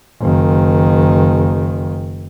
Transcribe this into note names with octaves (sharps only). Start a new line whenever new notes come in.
F#1 D#3